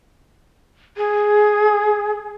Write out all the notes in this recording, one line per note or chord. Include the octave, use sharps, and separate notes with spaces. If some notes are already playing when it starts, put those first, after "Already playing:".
G#4